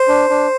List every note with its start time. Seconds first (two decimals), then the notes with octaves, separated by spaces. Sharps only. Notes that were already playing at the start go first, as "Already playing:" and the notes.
Already playing: C5
0.08 D4
0.29 D4